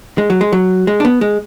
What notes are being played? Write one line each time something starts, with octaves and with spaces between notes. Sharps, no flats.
G#3
F#3
G#3
F#3
G#3
D4
B3
G#3